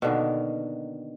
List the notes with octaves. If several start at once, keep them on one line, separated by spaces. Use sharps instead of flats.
B2 D3 D#3 A#3